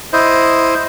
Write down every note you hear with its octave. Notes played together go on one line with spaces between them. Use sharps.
E4 C5 D#5